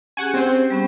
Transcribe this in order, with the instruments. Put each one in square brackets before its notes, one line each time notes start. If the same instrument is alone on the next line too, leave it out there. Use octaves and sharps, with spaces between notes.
[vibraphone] C#4 G4 G#4 [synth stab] F#5 G#5
[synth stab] C4 C5
[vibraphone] G3 B3 C#4